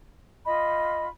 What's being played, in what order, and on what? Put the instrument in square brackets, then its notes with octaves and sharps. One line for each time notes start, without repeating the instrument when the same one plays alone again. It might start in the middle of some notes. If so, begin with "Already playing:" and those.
[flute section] F4 D#5 B5